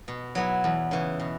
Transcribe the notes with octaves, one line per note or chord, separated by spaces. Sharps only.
B2
F#3 B3 E4
E2
C#3 E3
B2